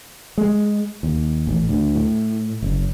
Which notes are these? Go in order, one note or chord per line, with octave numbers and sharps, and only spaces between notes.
G#3
D#2
A1
D2
A2
F#1